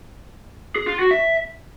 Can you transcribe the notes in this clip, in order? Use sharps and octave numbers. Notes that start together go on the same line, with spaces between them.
G#4
F4
F#4
E5